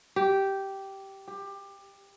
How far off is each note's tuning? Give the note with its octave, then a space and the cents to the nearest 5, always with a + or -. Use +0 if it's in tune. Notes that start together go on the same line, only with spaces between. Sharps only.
G4 -10
G4 +20